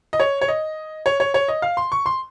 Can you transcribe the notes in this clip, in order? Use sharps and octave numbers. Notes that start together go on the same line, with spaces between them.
D#5
C#5
C#5
D#5
C#5
C#5
C#5
D#5
F5
C6
C#6
C6